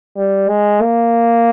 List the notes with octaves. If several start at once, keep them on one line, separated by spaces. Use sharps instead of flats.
G3
G#3
A#3